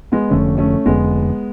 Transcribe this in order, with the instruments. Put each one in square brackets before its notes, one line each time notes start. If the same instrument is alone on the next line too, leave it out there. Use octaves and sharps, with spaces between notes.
[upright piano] G#3 B3
[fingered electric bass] F1 F2 D3 [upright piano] A3 C#4
[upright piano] A3 C#4
[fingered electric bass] F1 F2 D3 [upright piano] G#3 B3